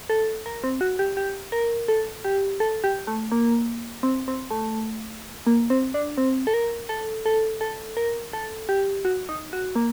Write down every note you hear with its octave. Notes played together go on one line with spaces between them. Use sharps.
A4
A#4
C4
F#4
G4
G4
A#4
A4
G4
A4
G4
A3
A#3
C4
C4
A3
A#3
C4
D4
C4
A4
A#4
A4
A4
A4
A#4
A4
G4
F#4
D#4
F#4
A#3